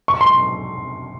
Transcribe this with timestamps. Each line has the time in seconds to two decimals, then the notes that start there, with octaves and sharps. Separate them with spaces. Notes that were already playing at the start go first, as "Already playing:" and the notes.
0.08 C#6
0.21 C6